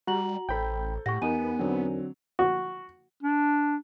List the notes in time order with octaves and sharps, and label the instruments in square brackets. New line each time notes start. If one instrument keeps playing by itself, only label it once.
[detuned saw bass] G3 [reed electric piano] F#4 [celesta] A#5 F#7
[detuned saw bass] A1 [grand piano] A4 C5 G6 [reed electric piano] G5 B5
[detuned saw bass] A2 [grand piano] G4 F#5 [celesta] C#6 A#6
[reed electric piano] E2 D#4 A#4 [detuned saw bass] B3 [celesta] G#5 D#7
[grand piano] D3 F#3 C4
[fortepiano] F#4
[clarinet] D4